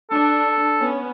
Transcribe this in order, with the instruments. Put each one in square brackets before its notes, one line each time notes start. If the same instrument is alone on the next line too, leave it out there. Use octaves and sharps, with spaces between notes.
[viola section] D4 [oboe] A4
[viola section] B3 C#4